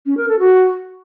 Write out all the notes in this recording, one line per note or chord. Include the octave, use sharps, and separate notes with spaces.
C#4
A#4
A4
F#4